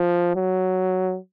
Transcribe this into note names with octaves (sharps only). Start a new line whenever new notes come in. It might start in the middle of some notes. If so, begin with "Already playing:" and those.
Already playing: F3
F#3